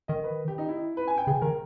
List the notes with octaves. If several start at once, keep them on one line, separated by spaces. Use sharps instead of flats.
D#3 D#5
B4
G4
D#4
E4
B4
G#5
G5
C#3 G#4
D#3 A#4